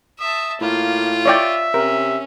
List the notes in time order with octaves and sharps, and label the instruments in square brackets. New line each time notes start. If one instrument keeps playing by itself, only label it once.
[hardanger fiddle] E5 A5 [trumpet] D#6
[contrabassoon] A2 [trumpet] A#3 [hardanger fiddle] F4
[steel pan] C#5 D5 G5 [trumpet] E5
[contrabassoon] C3 [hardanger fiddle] C#4 [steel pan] A#4